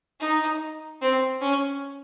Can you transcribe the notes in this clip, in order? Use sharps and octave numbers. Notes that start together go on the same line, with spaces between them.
D#4
C4
C#4